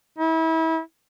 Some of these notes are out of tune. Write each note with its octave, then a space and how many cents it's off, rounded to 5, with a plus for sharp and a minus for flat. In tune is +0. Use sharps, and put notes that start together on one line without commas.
E4 -30